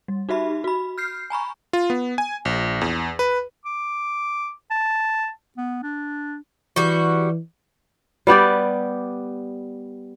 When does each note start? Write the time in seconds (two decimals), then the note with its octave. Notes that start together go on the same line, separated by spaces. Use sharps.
0.08 G3
0.29 D#4 F#4 G4 E5 B5
0.64 F#4 B5
0.98 F6 G6 C7
1.30 G#5 A#5 B5 C#6
1.73 F4
1.90 B3
2.18 G#5
2.45 A#1
2.81 E2
3.19 B4
3.65 D6
4.70 A5
5.57 B3
5.83 D4
6.76 E3 G3 F#4
8.27 G3 B3 G4 D5